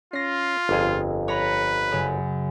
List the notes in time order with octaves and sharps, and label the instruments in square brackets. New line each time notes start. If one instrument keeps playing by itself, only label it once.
[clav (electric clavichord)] C#4 [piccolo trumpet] F4 [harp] A#6 C7
[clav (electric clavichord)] G1 F2 G#4
[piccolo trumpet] B4 [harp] C#5 A#5 B5
[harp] F#2 C#3